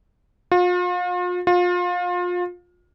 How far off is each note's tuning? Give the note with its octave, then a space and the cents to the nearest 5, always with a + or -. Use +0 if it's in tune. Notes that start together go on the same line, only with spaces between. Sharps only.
F4 +40
F4 +30